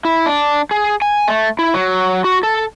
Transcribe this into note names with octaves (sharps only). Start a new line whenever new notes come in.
E4
D4
G#4
G#5
A3
E4
F#3
F#4
A4